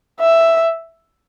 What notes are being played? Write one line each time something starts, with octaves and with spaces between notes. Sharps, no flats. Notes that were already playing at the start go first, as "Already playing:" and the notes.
E5